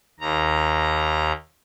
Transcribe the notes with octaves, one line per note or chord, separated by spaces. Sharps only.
D#2 A#5